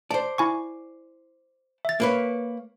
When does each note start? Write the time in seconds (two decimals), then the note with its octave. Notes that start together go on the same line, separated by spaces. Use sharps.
0.11 C5 D5 A5
0.38 E4 G#5 C#6
1.85 E5 A6
2.00 A#3 B4 C#5